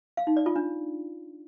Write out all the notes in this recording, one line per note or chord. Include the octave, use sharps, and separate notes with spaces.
F5
D#4
D5
F4
D4